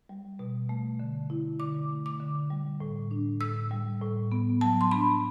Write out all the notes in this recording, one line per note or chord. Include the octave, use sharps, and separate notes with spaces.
G3
B2
A3
D3
E4
D3 D6
A3
D6
D3
G3
A2
D4
A2 E6
G3
A2
B3
F#3 A5
C6
D4 B5